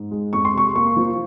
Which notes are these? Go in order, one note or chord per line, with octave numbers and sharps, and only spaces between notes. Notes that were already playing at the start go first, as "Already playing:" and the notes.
Already playing: G#2
G#3
F2 C#6
C6
C3 C#6
A#3 C#6
F3